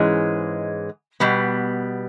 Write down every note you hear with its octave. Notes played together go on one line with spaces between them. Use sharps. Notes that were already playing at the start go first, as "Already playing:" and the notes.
Already playing: G#2 E3 G#3 C#4
B2 G3 B3